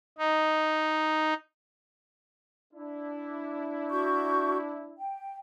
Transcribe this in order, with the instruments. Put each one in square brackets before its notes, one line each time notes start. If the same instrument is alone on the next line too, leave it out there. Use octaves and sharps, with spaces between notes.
[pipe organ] D#4
[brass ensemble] D4 E4
[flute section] F#4 C#6 G6
G5